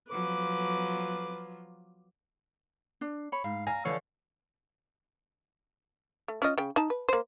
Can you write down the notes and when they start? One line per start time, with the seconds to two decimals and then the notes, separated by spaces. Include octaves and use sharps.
0.11 F3 F#3 F4 B4 D6
3.01 D4
3.32 C#5 B5
3.44 G#2 F5
3.67 F5 G#5 A#5
3.85 D3 E3 F3 C#5 F5
6.28 A3
6.42 C#4 F4 D#5
6.58 C#3 G5
6.76 D#4 A5
6.90 B4
7.09 A#3 C5